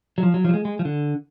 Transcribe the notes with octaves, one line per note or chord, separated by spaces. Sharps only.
F#3
F3
F#3
F3
F#3
G#3
G#3
F3
D3